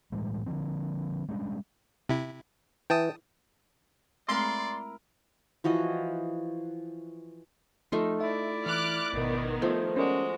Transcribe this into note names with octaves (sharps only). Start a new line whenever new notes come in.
A2 E3 G3 G#3
D3 D#3 F3 C4
G3 G#3 C#4 D4
C3 E4
E3 G5 A5 D#6
G#3 A3 C4 E4 A#4 D5 C6
E3 F3 F#4 D#5
F3 A3 D#4 F4
E4 D5 E5
E3 D6 F6 F#6
G#1 B2 D#3 B3
F3 A3 D#5 G6
G#3 C#4 F#4 A#4 D5